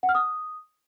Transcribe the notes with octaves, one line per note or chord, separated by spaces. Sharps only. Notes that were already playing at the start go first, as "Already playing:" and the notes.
F#5
F6
D#6